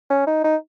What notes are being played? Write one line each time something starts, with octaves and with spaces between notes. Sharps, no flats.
C#4
D#4
D#4